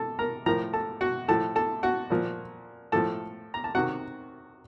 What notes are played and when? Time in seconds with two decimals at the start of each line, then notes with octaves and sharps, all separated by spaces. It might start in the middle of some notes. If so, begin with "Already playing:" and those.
Already playing: A4 A5
0.19 A#4 A#5
0.46 A2 F3 A#4 A#5
0.73 A4 A5
1.01 F#4 F#5
1.28 A2 F3 A4 A5
1.56 A4 A5
1.83 F#4 F#5
2.10 A#2 F3
2.92 A2 F3 A4 A5
3.54 A#5
3.64 A5
3.75 C3 D#3 F#4 F#5